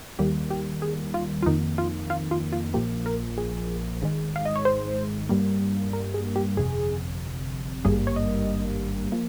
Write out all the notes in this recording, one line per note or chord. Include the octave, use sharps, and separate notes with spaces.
D#2 D#3 G3 A#3 G4
G4
G#4
F4
F4
F2 D#3 A#3 D#4
F4
F4
F4
F4
A#1 A#2 F3 A#3 G4
A#4
G#4
G#1 G#2 D#3 G#3
F5
D#5
C#5
C5
G2 G3 A#3
A#4
G#4
G4
G1 F2 C3 G#4
G#1 G2 G3 A#3 G#4
C#5
D#5
F3 A#3